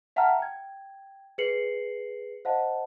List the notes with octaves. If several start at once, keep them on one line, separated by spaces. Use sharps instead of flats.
E5 F#5 G5 A5 A#5 F6
G5 G#6
G#4 B4 C7 C#7 F#7
C5 D#5 F5 F#5 A5